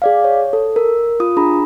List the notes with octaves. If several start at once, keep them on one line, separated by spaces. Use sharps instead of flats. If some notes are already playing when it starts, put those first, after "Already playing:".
G#4 D5 F5
C#5
A4
A#4
F4 D#6
D4 G#4 A#5 B5